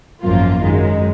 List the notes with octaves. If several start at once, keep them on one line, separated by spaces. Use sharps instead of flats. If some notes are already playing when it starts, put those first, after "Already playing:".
G#1 F#2 F3 A#3 F4
F#2 D#3 G#3